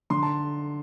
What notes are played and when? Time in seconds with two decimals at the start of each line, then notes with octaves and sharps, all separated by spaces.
0.10 D3 C6
0.23 A5